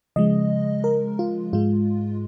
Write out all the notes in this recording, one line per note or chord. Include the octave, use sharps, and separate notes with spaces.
C#3 F3 G#3 D#5
A#4
F4
G#2 G#3 F4